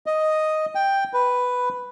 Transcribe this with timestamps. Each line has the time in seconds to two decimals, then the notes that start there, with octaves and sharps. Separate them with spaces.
0.06 D#5
0.75 G5
1.13 B4